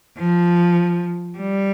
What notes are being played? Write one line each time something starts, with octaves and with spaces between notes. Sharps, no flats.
F3
G3